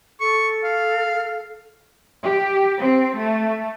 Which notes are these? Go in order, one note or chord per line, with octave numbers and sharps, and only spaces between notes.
A4 C#6
F5
G4
C4
A3